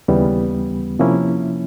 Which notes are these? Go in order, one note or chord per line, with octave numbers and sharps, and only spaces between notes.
D#2 C#3 E3 G3 B3
C3 F3 A#3 C#4 E4